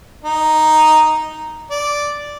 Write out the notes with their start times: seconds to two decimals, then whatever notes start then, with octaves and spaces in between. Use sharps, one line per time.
0.24 D#4
1.70 D5